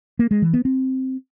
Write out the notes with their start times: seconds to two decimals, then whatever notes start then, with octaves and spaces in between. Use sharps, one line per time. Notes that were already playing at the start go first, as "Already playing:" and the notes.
0.19 A#3
0.31 G#3
0.42 E3
0.54 B3
0.65 C4